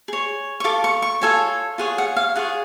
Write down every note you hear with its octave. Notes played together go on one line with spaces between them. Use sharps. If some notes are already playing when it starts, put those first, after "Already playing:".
G#4 C#5
C#6
F4 A4 D6
C#6
C#6
F4 A4 C#5 G#5
F4 G#4 C#5 F#5
F#5
F5
F4 G#4 C#5 F#5